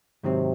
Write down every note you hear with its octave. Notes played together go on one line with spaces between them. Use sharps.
G#2 C3 D#3 F#3 C4